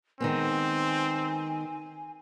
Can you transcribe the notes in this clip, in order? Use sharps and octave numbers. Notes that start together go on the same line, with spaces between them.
D#3 G#3 B3 C4 G#5